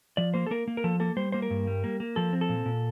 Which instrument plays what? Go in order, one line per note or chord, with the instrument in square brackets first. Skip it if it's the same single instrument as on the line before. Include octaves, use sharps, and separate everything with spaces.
[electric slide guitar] F3 D5
A#3 C5
A4
A#3 A#4
A#3
A#4
F3 A4
A#3 A4
G3 C5
A#3 C5
A#4
G2
G3
A#3
A#3
F3 A4
C4
A4
A#2
A#2